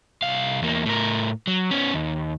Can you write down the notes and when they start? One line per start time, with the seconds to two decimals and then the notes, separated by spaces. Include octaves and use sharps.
0.22 C2 F5
0.62 E2 A#3
0.86 A2 A#4
1.47 F#3
1.71 B3 C#4
1.93 D#2